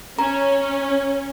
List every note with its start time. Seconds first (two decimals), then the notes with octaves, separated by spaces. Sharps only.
0.19 C#4 A#5